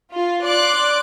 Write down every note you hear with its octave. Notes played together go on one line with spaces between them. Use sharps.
F4
D5 C6 D6 F#6 D7